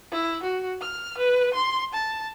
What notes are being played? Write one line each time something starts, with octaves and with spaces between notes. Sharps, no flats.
E4
F#4
F6
B4
C6
A5